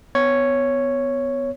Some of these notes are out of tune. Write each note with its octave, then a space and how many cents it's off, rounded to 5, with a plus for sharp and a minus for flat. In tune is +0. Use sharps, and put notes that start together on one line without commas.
B3 +20 C#5 +0